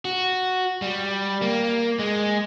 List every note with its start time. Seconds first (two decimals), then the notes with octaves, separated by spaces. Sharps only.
0.05 F#4
0.82 G3
1.42 A#3
1.99 G#3